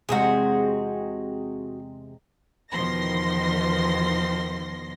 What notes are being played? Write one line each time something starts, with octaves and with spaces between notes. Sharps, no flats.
E2 C3 G#3 F#4 G#4
E2 B2 D#3 F3 C6 A#6